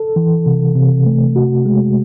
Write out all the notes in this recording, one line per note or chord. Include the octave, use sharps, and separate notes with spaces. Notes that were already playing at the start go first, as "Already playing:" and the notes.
Already playing: A4
E3
C3
C3
A3
F#4
G#3